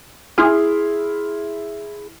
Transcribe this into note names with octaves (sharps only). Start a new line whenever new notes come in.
E4 G#4 C6 F6